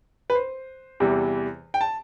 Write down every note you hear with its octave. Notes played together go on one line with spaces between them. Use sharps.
B4
C5
E2 C3 E3 G3
G5
A5